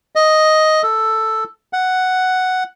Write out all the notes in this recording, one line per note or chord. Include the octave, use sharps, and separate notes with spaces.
D#5
A4
F#5